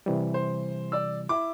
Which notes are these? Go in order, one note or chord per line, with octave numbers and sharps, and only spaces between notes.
C3 E3 G3
C5
D5 E6
E4 D6